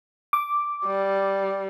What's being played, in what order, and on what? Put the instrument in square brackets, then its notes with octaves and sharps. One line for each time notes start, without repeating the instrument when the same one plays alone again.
[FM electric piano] D6
[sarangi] G3